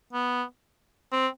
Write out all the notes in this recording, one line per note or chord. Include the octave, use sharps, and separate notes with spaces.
B3
C4